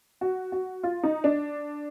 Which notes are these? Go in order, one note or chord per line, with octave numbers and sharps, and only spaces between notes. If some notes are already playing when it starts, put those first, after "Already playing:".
F#4
F#4
F4
D#4
D4